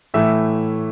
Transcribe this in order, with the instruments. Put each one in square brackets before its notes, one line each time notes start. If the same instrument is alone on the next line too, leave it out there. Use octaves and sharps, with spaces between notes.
[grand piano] A2 E3 A3 E5